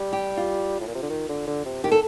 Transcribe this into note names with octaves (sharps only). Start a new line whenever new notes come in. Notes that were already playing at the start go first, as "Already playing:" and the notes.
Already playing: G3
G4
F4
A2
A#2
C3
D3
D#3
D3
D3
C3
D#3 G4
A4